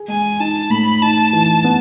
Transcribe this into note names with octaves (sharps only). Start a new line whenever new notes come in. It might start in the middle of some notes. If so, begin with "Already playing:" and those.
Already playing: G#4
G#3 G#5
D#4 A5
A2 B5
D#4 A5
E3
B3